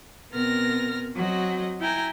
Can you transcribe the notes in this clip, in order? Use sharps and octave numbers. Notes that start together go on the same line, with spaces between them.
B2 B3 C4 A#4 F6 A#6
F#3 C4 F#4 D#5
E4 G5 G#5 A#5